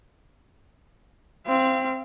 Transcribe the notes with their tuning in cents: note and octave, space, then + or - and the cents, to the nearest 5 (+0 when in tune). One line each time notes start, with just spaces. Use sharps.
C4 +0 F5 -35